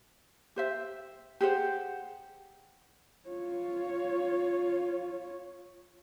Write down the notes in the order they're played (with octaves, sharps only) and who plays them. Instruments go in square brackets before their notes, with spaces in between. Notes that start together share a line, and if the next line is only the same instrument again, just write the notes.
[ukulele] G4 C5 E5
G4 G#4 C5 F#5
[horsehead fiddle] F4 C#5